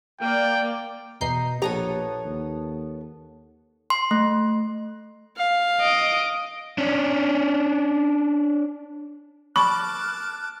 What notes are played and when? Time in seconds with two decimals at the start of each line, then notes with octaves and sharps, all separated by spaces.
0.21 A#3 D5 G5
1.21 E2 B2 D#4 G6 C7
1.62 A#1 B3 G4 A4 C#5 A#5
2.25 D#2
3.90 C6
4.11 A3
5.37 F5
5.81 D#5 D7
6.78 C#4 D4
9.56 A5 B5 C#6 D6 F6 F#6